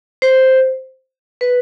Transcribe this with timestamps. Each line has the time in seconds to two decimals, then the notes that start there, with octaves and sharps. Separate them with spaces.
0.22 C5
1.41 B4